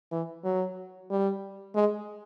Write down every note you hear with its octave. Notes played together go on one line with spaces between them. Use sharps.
E3
F#3
G3
G#3